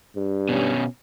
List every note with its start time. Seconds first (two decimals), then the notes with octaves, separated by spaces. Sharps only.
0.16 G2
0.49 B2 C#4